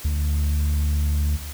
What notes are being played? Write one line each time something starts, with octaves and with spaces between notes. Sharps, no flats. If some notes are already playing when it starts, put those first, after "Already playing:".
D2